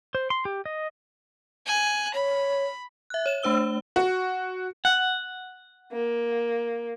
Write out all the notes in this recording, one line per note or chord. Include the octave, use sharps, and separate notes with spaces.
C5
C6
G4
D#5
G#5 F#6
C#5 B5
E5 F#6
C#5 E7
A3 D4 C5 E6 G7
F#4
F#5
A#3